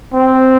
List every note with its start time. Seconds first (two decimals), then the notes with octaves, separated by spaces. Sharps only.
0.13 C4